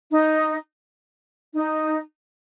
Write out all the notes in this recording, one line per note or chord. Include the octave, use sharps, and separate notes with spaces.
D#4
D#4